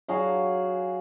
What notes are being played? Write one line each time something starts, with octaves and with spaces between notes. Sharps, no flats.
F#3 F#4 G#4 F5